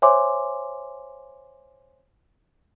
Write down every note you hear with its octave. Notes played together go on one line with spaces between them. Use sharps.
C5 C#5 E5 G#5 C6 D6